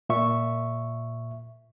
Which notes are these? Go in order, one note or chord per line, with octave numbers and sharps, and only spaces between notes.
A#2 E5 C#6